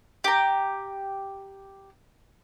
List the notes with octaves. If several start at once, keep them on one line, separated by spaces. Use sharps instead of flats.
G4 A#5